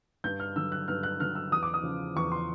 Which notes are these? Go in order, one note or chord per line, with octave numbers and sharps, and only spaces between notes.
G2 G6
F6
D3 F#3 E6
F#6
G2 F6
F#6
D3 F#3 F6
E6
E2 D#6
D6
D#6
C#3 F3
E2 C#6
C6